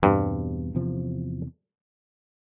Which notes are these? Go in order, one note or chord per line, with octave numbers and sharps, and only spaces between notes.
E2 G2 B2 G3 C4
E2 C3 F3